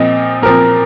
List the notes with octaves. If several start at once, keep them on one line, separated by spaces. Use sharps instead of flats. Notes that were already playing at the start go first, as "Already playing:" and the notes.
Already playing: A#2 F3 C4 D#5
A#2 F3 C4 A#4